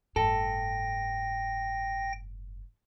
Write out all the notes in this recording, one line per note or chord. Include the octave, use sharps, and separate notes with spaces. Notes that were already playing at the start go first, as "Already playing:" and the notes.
F#1 G#2 A4 G5 A#6